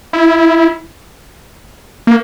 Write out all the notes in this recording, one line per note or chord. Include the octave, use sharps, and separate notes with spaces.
E4
A#3